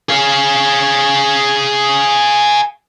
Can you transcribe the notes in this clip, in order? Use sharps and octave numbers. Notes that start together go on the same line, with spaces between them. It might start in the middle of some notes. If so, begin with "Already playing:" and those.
G#4 F5